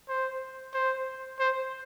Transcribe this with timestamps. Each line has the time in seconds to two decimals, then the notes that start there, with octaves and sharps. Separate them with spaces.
0.08 C5
0.74 C5
1.39 C5